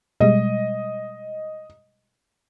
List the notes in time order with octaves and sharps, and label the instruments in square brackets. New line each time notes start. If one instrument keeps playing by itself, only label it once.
[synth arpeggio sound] B2 G3 G#3 [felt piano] D#5